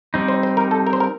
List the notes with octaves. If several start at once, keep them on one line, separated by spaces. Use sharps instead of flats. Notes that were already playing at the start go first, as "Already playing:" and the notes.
G3 C4 D#4
C5
C5
A#4
A4
A#4
C5
A#4